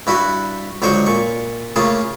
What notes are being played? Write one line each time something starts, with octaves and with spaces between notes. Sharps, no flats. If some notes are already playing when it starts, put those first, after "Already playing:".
G2 E4 F#4 B4
C#2 D3 F#3 C5 C#6
A#2 C#6
C#3 A3 A#3 F4 G#4